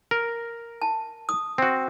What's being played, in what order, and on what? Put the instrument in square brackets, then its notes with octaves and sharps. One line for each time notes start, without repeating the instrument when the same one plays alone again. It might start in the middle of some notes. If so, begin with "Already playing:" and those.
[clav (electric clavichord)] A#4
[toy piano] A5
D#6
[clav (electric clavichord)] C4 F#4